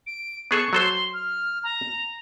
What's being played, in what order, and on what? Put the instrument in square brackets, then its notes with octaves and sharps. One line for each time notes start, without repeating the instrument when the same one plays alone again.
[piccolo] D7
[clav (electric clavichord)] B3 G#4 A4 [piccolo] C#6
[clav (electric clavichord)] F#3 A4 C5 [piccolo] C6
[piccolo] F6
A#5